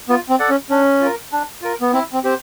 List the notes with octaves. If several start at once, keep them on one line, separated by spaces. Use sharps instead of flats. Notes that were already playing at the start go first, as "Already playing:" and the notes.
B3 F4
C4
A4 D5 F#5
C#4
C#4 D4
F4 A#4
D4
F4 A#4
B3
C4 E4
C4
C4 G4 C5